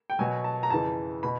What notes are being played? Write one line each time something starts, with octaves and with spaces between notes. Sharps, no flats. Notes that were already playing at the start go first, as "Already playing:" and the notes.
G5
B2 F#3 G#5
A5
A#5
F2 C#3 E3 A5
B2 B5